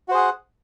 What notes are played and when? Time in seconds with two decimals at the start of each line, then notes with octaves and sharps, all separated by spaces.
0.08 F#4
0.11 C5
0.14 G#4
0.17 F#5